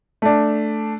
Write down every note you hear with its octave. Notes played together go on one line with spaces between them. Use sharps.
A3 D4